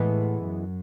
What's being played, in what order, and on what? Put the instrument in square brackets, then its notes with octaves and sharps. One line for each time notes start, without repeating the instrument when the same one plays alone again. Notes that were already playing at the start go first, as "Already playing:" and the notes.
Already playing: [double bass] A2 [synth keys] E3 G#3 B3
[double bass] F#2